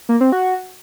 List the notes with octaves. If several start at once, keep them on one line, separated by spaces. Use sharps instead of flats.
A#3
C4
F#4